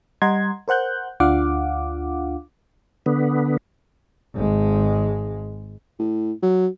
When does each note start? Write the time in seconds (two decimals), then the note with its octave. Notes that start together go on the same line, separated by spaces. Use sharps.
0.22 G3 D#5 F#5 A#5 C6 G#6
0.68 A#4 C5 F#5 F#6 G6
1.20 D2 D4 F4 F5 F#5 D6
3.06 D3 B3
4.35 G#1 G#3
5.99 A2
6.43 F#3